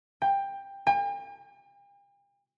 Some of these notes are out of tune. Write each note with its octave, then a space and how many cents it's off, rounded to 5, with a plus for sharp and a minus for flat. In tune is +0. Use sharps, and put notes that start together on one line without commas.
G5 +15
G5 +45